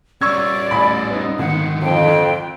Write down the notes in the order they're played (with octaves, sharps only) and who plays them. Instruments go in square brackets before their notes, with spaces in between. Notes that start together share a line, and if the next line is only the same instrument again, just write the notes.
[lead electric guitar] G3 C#4 [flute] D5 [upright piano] C#6 E6 G#6
[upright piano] A1 B5
B3 D#4
[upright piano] G#1 [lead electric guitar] D3 D#3 [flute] F#5
[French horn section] F2 [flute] G5